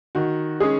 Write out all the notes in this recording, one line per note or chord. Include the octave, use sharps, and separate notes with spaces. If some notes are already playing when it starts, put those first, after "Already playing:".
D#3 F#4
G#3 C#4 G#4